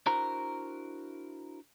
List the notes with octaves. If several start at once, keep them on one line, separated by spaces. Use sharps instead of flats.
D4 E4 F#4 A#4 C5 A#5